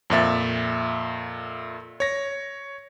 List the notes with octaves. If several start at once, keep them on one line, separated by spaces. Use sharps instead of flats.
F2 A#2 E5 A6
C#5 A#6